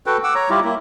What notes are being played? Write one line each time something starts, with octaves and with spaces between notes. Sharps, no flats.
F#4 A4 B4 G5
F#5 D6 E6
C#5 A#5
G3 E4 F4 G4
A#3 E4